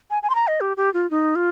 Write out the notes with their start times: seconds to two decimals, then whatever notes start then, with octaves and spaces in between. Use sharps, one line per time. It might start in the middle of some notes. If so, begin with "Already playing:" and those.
0.10 G#5
0.23 G#5
0.30 C6
0.35 A#5
0.47 D#5
0.61 G4
0.77 G4
0.94 F4
1.11 D#4
1.35 F4